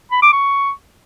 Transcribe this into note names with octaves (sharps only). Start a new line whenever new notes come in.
B5
D6
C#6